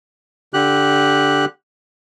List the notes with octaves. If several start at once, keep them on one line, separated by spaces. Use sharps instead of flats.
D3 G4 F#6